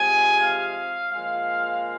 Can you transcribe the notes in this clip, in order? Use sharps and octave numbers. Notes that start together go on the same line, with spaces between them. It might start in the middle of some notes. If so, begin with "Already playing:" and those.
Already playing: C3 F3 G#3 G#5
F5
A#2 F3 G#3 F5